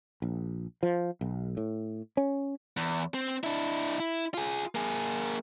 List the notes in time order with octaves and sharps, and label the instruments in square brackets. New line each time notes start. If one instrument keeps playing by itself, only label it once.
[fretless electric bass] A#1
F3
B1
A2
C#4
[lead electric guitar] E2
C4
D4 E4
E4
F4 G#4
A#3 G#4